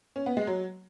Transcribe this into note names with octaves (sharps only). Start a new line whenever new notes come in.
C#4
B3
G#3
F#3